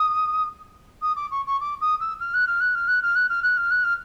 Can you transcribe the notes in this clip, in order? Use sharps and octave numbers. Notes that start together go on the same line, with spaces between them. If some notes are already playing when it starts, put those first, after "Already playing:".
Already playing: D#6
D#6
D6
C#6
C#6
D6
D#6
E6
F6
F#6
F6
F#6
F6
F#6
F6
F#6
F6
F#6
F6
F#6
F6